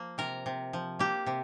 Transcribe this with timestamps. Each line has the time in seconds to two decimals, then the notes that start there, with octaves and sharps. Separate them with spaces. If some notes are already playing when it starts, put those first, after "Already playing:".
Already playing: F3 A#3
0.18 C3 A#4
0.46 C3
0.73 F3
0.99 A#3 G4
1.26 C3